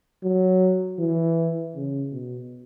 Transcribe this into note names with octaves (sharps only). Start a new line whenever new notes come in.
F#3
E3
C#3
B2